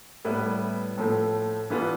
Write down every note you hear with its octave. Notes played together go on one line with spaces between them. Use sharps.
A2 G3 B3 E4 B4
A2 F3 A3
G2 E3 G3 B3 F4